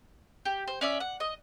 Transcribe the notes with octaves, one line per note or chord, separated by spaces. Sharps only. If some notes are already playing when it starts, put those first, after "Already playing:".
G4
C5
C#4 D5 E5
F#5
D#5